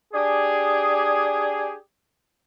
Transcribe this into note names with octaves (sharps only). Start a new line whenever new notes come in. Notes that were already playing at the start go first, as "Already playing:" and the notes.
D4 G4 G#4